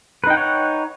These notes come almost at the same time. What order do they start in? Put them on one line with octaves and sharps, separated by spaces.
B4 D#4 G5 F#5 C#5